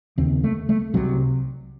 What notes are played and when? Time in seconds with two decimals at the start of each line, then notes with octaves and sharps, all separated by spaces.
0.18 D#2 C#3 C4
0.44 A3
0.69 A3
0.94 C2 C3 F#3